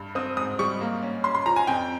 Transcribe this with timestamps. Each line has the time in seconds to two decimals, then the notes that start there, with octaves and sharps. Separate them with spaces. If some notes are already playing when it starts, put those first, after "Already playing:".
Already playing: G2
0.15 C4 D#6
0.37 G#2 D#6
0.59 G3 C#6
0.81 A#3
1.02 C#4
1.24 C#4 C6
1.35 C6
1.46 F3 A#5
1.56 G#5
1.67 F2 G5